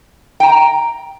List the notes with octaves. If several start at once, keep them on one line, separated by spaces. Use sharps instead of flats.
G5 A#5